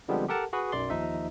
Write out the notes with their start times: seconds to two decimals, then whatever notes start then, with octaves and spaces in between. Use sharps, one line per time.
0.08 D3 F3 G3 G#3 B3 C4
0.28 G4 A4 A#4 F#5 A5
0.53 F#4 G#4 B4
0.72 B1 F#2 D5 C6
0.90 D#2 F3 D#4 E5